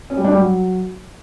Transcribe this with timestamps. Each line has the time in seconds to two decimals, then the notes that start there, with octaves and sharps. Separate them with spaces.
0.10 C#4
0.17 G3
0.24 D4
0.32 G3
0.39 F#3